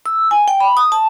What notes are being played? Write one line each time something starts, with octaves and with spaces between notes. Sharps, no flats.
E6
G#5
G5
B5
D#6
A5